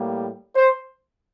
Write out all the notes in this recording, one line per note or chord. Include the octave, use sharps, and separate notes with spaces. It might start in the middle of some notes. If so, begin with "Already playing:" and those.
Already playing: A2 G3 A#3
C5